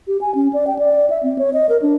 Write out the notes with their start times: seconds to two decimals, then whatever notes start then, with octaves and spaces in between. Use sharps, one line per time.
0.08 G4
0.21 G#5
0.35 C#4
0.53 D5
0.67 G5
0.79 D5
1.10 E5
1.23 C4
1.39 C#5
1.53 D#5
1.69 A#4
1.82 D4